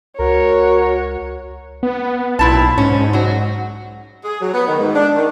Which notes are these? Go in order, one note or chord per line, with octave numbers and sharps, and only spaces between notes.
C#2 F#4 A#4 C#5
B3
B1 A#2 E4 A5
G#2 C#4
F#3 F#4
G#4
F#3
B3
D#3
G#2
D4
D#3